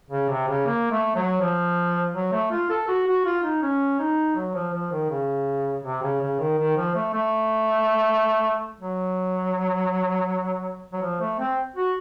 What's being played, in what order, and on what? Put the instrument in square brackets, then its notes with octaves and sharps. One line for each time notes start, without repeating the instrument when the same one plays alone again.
[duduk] C#3
C3
C#3
A#3
A3
F#3
F3
F#3
A3
F4
A4
F#4
F#4
F4
D#4
C#4
D#4
F#3
F3
F3
D#3
C#3
C3
C#3
C#3
D#3
D#3
F3
A3
A3
F#3
F#3
F3
A3
C4
F#4